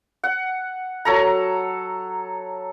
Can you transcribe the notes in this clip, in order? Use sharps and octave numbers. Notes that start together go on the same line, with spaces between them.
F#5
F#3 A4 A#5